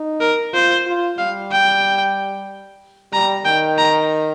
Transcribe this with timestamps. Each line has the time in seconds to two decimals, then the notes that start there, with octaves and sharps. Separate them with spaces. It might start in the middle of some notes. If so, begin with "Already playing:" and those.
Already playing: D#4
0.21 A#4
0.53 F4 C5
0.86 F4
1.18 G3 F5
1.51 G5
3.13 G3 A#5
3.45 D#3 G5
3.78 A#5